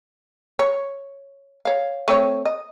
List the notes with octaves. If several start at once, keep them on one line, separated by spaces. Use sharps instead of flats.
C#5
C#5 F5
A3 C4 C#5
D#5